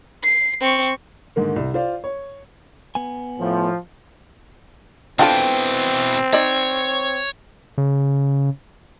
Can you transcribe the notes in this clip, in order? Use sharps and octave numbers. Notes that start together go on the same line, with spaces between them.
C7
C4 C#6
G#2 D3 D#3 A#3
C2
F4 C5 D5 F5
C#5
B3 G#5
A2 F3
B2 E3 C4 D4 F4 A4 G5
D#4 C#5 D5
C#3